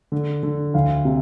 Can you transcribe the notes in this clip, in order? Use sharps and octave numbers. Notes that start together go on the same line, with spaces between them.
D3
D3
D2 F5
C3